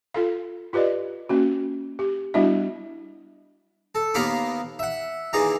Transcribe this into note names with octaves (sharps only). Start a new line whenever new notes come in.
F4 A4 F5
F4 G4 B4 D5 D#5
A#3 C#4 F#4
G4
G3 B3 D4 E4 F#4 E5
A4
D#2 A#3 B3 F5 B5 D6
E5 F#5
D#2 E3 G#4 D5 A#5